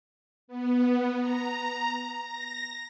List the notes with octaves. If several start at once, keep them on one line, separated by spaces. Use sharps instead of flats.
B3
A#5
A#6